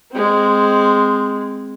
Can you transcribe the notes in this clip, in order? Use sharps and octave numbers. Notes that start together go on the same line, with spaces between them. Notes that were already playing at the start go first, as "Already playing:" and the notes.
G#3 C4